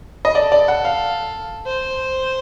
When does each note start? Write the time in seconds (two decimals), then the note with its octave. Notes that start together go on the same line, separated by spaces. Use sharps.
0.25 D#5
0.35 A4 D5
0.52 D5
0.68 F#5
0.85 F5
1.66 C5